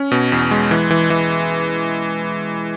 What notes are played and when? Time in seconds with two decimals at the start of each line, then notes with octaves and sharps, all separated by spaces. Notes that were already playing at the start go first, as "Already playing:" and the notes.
Already playing: C#4
0.11 B2
0.32 E2
0.51 G#3
0.71 E3
0.91 E3
1.10 E3